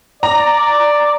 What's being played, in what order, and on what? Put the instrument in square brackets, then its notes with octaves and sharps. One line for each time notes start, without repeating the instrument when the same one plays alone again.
[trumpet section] D5 [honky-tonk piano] A#5